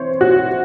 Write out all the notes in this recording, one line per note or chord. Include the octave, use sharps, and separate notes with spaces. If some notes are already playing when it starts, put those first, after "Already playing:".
Already playing: C3 E3 C5 C#5
F#4